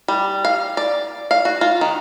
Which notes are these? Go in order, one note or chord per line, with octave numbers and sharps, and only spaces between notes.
G3
F5
D5
F5
F#4
F4
D#3